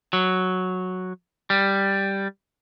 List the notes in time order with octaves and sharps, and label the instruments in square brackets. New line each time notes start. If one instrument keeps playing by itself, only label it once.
[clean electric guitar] F#3
G3